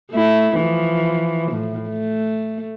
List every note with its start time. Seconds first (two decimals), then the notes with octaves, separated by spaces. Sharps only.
0.12 A3 E4
0.56 E3 F3
1.52 A2
1.90 A3